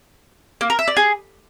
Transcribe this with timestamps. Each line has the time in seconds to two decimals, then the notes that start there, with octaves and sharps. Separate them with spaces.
0.61 A#3
0.70 A#4
0.79 E5
0.88 D5
0.96 G#4